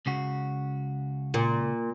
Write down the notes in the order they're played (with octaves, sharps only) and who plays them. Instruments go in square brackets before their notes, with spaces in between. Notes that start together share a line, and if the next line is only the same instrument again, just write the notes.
[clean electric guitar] C#2 C#3 F#4
[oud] A#2